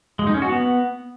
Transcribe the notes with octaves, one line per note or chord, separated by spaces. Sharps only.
G#3
D#4
C#4
F#4
B3